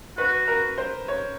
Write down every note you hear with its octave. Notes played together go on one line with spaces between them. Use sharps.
F#4 B4
A#4
C5
C#5